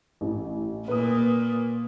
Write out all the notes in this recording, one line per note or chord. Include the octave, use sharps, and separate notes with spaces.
A1
A#2 A#3 B4 D#6